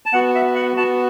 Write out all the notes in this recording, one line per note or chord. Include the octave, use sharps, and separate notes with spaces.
A5
B3 F#4 F#5
E5
F#5
B3 F#4 A5